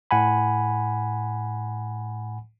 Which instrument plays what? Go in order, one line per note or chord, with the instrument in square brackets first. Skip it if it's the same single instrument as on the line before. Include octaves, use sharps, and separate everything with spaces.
[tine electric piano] A2 F#5 G#5 B5